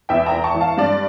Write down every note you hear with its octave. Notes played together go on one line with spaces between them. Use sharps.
E2 E5 G5
G5 A#5
E2
A5 C#6
E3
F5 A5
G2 D5